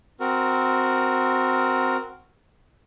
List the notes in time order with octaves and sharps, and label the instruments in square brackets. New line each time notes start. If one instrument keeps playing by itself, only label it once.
[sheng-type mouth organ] C4 F#4 A#4